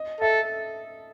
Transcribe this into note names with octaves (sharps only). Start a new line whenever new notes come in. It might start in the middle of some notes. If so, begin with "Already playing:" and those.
Already playing: D#5
A4 E5